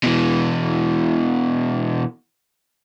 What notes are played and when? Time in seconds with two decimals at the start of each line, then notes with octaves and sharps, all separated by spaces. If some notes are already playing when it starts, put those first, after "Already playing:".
0.03 B2 E3